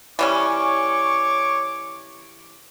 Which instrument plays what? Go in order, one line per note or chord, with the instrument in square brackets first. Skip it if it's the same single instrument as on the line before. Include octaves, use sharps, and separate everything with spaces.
[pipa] E3 G3 C#4 [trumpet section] C#5 C#6 D6